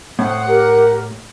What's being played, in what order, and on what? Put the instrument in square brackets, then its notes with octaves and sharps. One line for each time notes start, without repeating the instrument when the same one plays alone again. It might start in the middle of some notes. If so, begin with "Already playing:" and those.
[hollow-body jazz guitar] A2 [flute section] C5 D#6 [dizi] F#5
[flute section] G4 A#4